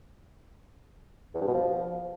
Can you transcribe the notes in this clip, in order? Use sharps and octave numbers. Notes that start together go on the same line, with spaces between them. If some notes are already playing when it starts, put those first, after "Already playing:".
E2
G2
B2
F3